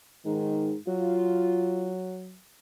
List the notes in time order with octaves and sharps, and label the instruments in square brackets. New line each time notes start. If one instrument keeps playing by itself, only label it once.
[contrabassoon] G#2 [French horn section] D#3
[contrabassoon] F#3 [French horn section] F4